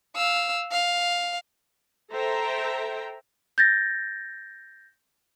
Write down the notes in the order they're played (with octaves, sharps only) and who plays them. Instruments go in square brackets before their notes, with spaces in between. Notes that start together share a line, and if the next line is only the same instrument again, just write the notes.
[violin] F5 E6
F5
[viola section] A4 C5 E5 G5 A#5
[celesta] G6 A6 A#6